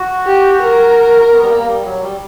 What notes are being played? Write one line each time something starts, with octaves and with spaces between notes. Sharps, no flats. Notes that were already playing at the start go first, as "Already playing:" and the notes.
Already playing: F#4
G4
A#4
B3
G3
A#3
G3
F#3
G3